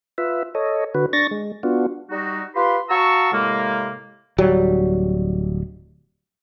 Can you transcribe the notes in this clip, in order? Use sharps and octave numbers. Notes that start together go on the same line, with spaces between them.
F4 B4 E5
A4 C#5 D#5
D3 F#4 B4
D4 C#6 A6 A#6
G#3
B3 D4 F4 F#4
G3 D#4 F#4
F4 G4 B4 B5 C6
F#4 F5 A5 A#5 C#6 E6
A2 C3 G#3 A#3
D1 F#3 G3